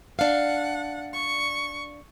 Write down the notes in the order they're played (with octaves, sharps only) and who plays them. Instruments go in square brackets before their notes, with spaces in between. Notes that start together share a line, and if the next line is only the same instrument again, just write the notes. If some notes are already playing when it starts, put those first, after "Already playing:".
[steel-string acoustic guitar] D4 F5 [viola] F#5
[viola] C#6